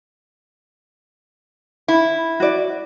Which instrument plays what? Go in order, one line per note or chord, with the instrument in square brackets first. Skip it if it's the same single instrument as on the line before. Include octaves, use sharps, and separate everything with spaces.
[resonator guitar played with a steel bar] E4
[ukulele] F#4 D5